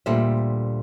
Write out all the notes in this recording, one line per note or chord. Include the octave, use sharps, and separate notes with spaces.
D2 A#2 G3 A4 C5 E5